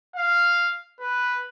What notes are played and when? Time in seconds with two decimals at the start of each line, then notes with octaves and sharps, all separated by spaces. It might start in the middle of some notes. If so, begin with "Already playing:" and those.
0.16 F5
1.00 B4